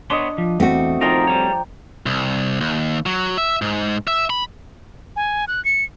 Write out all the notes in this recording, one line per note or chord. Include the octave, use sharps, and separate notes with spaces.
B3 D4 C#5 D#5 C6
F3
E2 A3 C4 F#4
F3 D#4 F4 A#4 G5 A#5
G3 C#5
C2
D#2
F#3
E5
G#2
E5
B5
G#5
F#6
C#7